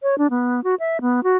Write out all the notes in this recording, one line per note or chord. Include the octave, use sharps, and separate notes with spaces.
C#5
D4
B3
F#4
E5
B3
F#4